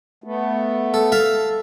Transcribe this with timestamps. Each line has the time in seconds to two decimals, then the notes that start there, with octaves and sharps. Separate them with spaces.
0.24 A3 B3
0.94 A4
1.12 A4 E5 F5